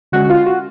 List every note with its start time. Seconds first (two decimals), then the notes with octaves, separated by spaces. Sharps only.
0.12 D3 G#3 C#4 F#4
0.25 F#4
0.30 F4
0.46 F#4